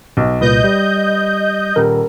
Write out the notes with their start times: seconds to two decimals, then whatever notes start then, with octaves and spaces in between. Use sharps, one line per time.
0.17 B1
0.41 C2 A#2 B4 D#5 G6
0.64 G3
1.76 D#1 A#4